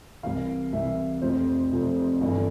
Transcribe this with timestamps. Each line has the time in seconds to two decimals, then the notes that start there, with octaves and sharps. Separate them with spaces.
0.23 C2 C3 E3 F5
0.72 C2 C3 E3 E5
1.22 F1 F2 C3 F3 C5
1.71 F1 F2 C3 F3
2.21 G1 G2 E3